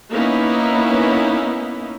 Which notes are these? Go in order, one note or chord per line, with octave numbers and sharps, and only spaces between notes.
A#3 B3 C#4 D#4 E4